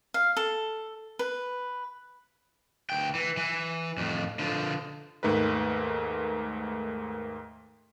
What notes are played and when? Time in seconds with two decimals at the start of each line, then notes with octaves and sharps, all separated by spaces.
0.14 F5
0.37 A4
1.19 B4
2.90 D2 G5
3.15 E3
3.37 E3
3.97 F2 A2
4.39 D3 F3
5.23 D#2 G#2 A3 D#4 A#4 B4